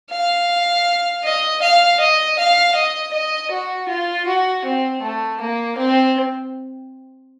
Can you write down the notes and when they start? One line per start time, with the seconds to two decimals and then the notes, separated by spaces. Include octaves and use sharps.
0.10 F5
1.24 D#5
1.62 F5
2.00 D#5
2.38 F5
2.75 D#5
3.13 D#5
3.51 F#4
3.88 F4
4.27 F#4
4.65 C4
5.02 A3
5.41 A#3
5.78 C4